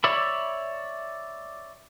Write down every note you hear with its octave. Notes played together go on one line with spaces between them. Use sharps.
C#5 D5 E5 B5